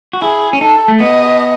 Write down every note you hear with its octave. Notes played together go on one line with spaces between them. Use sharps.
F#4
E4 G#4
C#4
D#4 A4
A3
B3 D#5